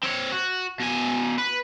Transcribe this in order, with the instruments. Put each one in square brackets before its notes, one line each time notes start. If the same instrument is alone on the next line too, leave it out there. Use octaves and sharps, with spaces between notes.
[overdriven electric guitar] C4 C#5
F#4
B2 G#5
B4